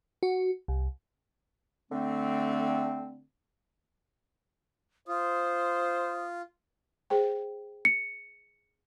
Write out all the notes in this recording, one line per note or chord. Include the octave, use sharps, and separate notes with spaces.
F#4
C2
D3 A3 C4
F4 C5 D#6
G#4 C5 G5
C#7